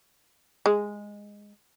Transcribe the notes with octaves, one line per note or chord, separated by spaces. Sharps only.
G#3